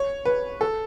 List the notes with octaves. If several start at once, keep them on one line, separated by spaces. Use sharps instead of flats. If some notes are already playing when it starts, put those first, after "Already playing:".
Already playing: C#5
B4
A4